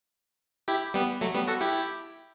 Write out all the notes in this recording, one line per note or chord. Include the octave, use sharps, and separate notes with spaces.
E4 G4
G3 B3
F#3 A3
G3 B3
F#4 A4
E4 G4